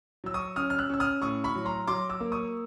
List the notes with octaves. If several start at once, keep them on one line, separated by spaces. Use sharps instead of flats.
F#3 E6
C#6 D#6
C#4 D#6 F6
F6
E6 F#6
C#4 E6
D#6 F6
A2 C#6 D#6
B5 C#6
F#3
A#5 C6
F#3 C6 D6
D6 E6
A#3
C#6 D#6